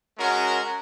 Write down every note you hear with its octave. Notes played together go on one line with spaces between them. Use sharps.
G#3 C#4 F#4 A#4